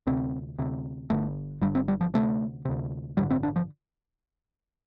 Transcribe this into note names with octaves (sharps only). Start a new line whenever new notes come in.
D2 C3 C4
D2 C3
G1 G2 D3 A3
G1 G2 D3 G3
C4
G3
F3
D2 C3 A3
D2 C3
A1 G2 D3 G3
C4
D4
F3